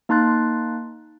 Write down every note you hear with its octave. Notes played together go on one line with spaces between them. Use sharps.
A#3 D#4 A5 C6 F#6 A6